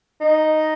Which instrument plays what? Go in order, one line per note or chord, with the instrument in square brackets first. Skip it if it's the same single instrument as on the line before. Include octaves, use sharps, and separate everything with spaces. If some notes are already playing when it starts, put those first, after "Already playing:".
[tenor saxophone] D#4